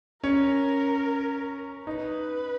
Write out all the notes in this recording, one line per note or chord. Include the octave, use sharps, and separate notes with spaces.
C#4 A#4
D#4 B4